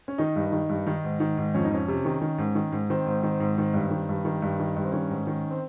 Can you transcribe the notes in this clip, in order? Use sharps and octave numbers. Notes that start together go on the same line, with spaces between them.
C#4
D#3 D#4
G2
D#3
G2
D#3
G#2
D#3
G#2
F2 C#4
D#4
F2 C#4
C3
D#3
D#3
G#2
D#3
G#2
D#3 C4
G#2
D#3
G#2
D#3
G2
D#3
G2
D#3
G2
D#3
G2
C4
D#3 C#4
G#2
D#3
C4